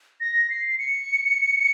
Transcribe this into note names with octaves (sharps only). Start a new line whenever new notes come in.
A#6
C7
C7
C#7